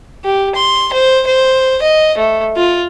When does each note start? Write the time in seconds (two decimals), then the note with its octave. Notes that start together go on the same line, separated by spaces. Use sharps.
0.24 G4
0.55 C6
0.93 C5
1.27 C5
1.82 D#5
2.18 A3
2.57 F4